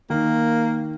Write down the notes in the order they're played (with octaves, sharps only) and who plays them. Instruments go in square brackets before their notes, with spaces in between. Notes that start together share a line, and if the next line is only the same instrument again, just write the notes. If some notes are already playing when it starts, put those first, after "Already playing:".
[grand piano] D#3 [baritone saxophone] A#3